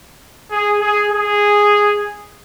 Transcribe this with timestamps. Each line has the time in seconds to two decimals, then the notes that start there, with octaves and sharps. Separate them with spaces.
0.51 G#4
0.81 G#4
1.10 G#4